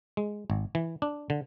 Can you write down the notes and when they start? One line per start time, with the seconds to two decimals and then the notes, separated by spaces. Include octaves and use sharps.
0.17 G#3
0.50 G#1
0.75 E3
1.02 D4
1.30 D3